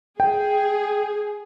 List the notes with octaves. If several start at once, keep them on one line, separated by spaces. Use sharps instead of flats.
G#4 G5